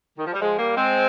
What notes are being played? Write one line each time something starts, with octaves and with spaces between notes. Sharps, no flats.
D#3
F3
G3
F3 G#3
G3 A#3
G#3 C4